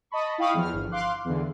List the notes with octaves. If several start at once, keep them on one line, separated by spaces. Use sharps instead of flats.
D#5 A5 B5 C#6
E4 F5 G5 B5 C#6 D#6
E2 F3 F6
G1
F5 C6 D6 F#6
E2 D3